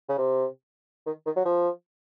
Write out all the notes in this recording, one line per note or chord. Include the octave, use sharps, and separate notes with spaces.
C#3
C3
D#3
D#3
F#3
F3